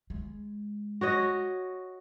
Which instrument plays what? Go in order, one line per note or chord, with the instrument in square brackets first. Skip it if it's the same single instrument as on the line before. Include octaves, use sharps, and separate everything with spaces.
[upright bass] G#3
[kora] F#4 C#5 D#5